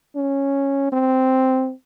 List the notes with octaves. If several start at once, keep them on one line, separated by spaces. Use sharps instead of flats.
C#4
C4